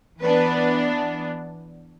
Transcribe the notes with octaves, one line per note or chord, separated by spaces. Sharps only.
E3 B3 D4 B4